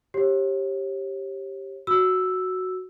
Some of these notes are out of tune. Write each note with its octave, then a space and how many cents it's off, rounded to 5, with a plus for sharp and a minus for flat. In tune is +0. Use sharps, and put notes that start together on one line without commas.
G4 +0 C#5 -40
F#4 +0 E6 +0